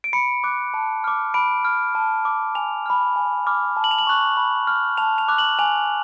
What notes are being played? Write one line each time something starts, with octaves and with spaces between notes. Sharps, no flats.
D7
B5 C#7
D6 F#6
A5
D6 F6
B5 D7
F6
A5
D6 F6
G#5 F7
B5 F6
G#5
B5 D6 F6
A5
F#7
F7
F#7
C#6 F#6
B5
F6
A5 F7
F7
D6 F#6
F#7
G#5 F7